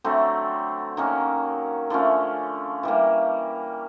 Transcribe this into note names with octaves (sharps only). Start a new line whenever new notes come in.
D3 F#3 A3 C4
D#3 F#3 A#3 C#4
D3 F3 A3 C#4
E3 G3 A#3